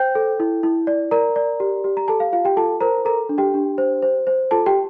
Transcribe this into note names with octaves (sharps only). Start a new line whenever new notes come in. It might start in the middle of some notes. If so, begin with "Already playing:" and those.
Already playing: C5 G5 G6
A4
E4
E4
D5
A#4 D5 A#5
D5
G4
G4
A#5
A4 A5
F5
F4 F5
G4 G5
F4 A4 A5
A#4 C5 A#5
A4 A#4 A#5
D4
G4 G5
D4
C5
C5
C5
F4 A4 A5
G4 G5